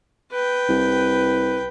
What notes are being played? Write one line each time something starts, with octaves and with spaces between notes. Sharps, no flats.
B4 G5
C2